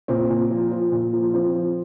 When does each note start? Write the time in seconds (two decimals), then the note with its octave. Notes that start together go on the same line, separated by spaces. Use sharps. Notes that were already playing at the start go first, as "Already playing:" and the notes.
0.08 A#2 C4
0.30 A#2
0.51 F3
0.71 F3
0.92 A#2
1.13 F3
1.34 F3 C4
1.54 F3